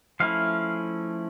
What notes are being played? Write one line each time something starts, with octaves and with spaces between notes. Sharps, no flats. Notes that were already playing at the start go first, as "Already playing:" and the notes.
F3 A3 C#4 E4 F5